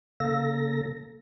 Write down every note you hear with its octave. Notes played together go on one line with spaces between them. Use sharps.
C#3 A#3 A4 A#6